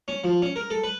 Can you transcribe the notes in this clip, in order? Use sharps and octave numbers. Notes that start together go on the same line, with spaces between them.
C#4
F3
C#4
A#4
A4
B4